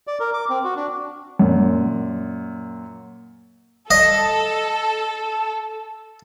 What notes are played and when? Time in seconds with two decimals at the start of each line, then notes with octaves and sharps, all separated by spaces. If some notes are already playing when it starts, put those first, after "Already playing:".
0.07 D5
0.20 A#4
0.34 D6
0.50 C4
0.64 F#4
0.76 D4
1.39 F#2 A#2
3.91 A4 D#5